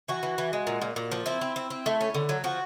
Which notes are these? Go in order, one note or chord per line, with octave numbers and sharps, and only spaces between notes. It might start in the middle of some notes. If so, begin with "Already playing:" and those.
E3 F#4
E3
E3
G#3
A#2
A#2
A#2
F3
C4 E4
C4
C4
C4
A3
C#4
D3
F#3
F3 F#4